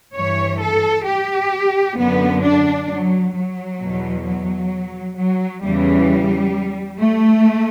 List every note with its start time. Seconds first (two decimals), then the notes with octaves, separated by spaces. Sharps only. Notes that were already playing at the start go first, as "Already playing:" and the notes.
0.15 G2 E3 C#5
0.61 A4
1.06 G4
1.98 F#2 D3 B3
2.43 D4
2.90 F#3
3.34 F#3
3.80 E2 B2
4.26 F#3
5.17 F#3
5.63 E2 C#3 E3 G3
7.00 A3